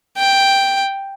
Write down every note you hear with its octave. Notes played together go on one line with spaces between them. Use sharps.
G5